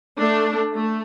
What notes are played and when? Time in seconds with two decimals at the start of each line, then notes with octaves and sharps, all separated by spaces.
0.19 A3 D4
0.74 A3